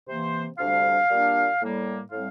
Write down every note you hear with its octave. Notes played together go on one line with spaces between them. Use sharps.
C3 E3 A#3 C5
D2 C3 G3 D4 F5
A#2 G3 A#3 D4
A2 G3 A#3
A2 G3 C4 F5